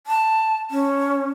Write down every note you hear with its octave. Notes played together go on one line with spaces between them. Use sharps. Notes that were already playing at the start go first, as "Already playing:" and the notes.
A5
C#4